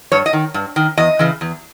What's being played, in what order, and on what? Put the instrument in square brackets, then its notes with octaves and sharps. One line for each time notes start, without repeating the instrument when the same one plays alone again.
[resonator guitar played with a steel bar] G2 C#5
D#5
D#3
G2
D#3
E2 D#5
C#3 E3
E2